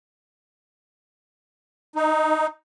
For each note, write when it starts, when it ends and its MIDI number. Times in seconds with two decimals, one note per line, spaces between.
1.96 2.47 63